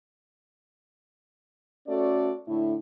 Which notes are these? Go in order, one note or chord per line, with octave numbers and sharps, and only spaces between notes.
A3 C#4 F#4 A4 D5
A2 D3 A3 E4